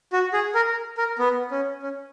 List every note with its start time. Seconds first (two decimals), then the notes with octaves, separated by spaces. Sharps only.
0.13 F#4
0.33 G#4
0.55 A#4
0.98 A#4
1.19 B3
1.51 C#4
1.83 C#4